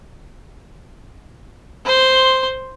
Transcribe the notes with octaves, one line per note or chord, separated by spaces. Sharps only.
C5 C6